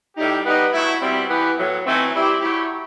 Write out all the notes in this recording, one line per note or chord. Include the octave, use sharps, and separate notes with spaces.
A2 G3 D#4 G4
G3 B3 D#4
F#3 A3 E4
B2 G3 C4 E4
E3 B3 E4 G4
A2 F#3 B3
E3 A3 C4 D#4 F#4
G3 C4 E4 G4
F#3 A3 E4 G4